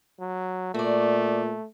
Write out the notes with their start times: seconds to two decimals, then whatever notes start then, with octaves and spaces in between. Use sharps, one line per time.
0.20 F#3
0.74 A#2 A3 F#4 D5